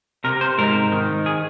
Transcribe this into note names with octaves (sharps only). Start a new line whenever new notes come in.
C3 A#4
C5
G#2 A#4
D#3
G#4